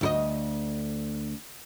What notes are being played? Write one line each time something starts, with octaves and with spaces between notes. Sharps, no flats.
D2 E4 D#5